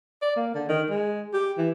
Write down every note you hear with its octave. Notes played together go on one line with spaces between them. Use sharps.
D5
A#3
D3
D#3
G#3
G4
E3